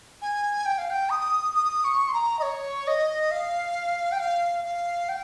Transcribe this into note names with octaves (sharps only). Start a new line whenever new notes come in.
G#5
G5
F5
G5
D#6
D#6
C#6
C6
A#5
D#5
C#5
D#5
F5
G5
F5
F5
G5